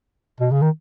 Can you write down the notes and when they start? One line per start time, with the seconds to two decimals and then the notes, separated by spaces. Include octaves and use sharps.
0.40 B2
0.51 C#3
0.62 D#3